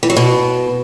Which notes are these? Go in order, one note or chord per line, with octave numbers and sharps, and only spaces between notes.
E3
F#3
B2